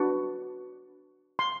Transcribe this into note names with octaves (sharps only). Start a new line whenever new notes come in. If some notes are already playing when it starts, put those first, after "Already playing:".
Already playing: D4 F#4 B4
C6